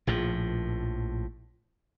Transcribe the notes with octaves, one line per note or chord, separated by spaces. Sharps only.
A#1 A2 F3